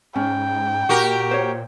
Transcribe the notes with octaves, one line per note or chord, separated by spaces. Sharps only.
G#2 C#4 G5
A#2 F#4 G4 A#4
C5 C#5